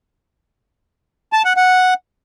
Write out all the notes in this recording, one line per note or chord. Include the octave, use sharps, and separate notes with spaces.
A5
F#5
F#5